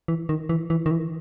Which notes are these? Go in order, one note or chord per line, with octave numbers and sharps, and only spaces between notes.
E3
D#3
E3
E3
D#3
E3